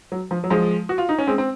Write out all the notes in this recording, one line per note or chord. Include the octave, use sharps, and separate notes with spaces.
F#3
F3
F#3
F3 G#3
F#4
F4
D#4
C#4
G#3 C4
C4